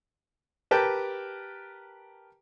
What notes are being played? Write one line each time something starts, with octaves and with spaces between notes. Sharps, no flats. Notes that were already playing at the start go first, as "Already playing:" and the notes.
G4 A#4 B4 G5 A5